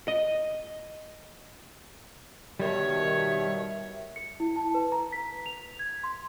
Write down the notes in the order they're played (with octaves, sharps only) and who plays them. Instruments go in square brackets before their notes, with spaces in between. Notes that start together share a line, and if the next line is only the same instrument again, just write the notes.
[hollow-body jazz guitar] D#5
[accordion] B2 D#3 [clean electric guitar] G3 [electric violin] C#5 [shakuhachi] E5
[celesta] C#7
E4
A5
B4
A#5
B6
F7
G#6
C6